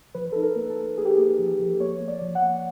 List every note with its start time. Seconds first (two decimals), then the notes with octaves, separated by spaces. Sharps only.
0.15 F3 B4
0.32 D#4 A4
0.42 A#4
0.56 A#3
0.70 A4
0.77 A#3
0.98 A#3 G#4
1.05 G4
1.14 A#3 G#4
1.39 F3
1.60 F3
1.80 A#3 C#5
2.01 A#3
2.08 D5
2.22 F3
2.35 F#5
2.42 A#3